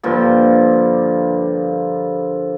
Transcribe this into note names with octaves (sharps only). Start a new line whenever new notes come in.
G2 D3 F3 A#3